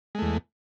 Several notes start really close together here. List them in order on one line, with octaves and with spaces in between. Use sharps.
G#3 A3 E2